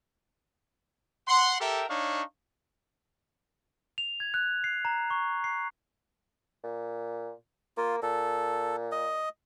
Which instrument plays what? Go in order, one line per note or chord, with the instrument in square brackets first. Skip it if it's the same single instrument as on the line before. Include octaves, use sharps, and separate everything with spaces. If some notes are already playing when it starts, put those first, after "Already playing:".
[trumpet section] F#5 C6
G4 A4 A#4 E5 G5
D4 D#4 C#5 F5 C#6
[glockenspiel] F7
G#6
F#6
C7
A#5
C#6
C7
[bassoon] A#2
[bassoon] A#3 [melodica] F4
[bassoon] A#2 [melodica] A4
[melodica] D#5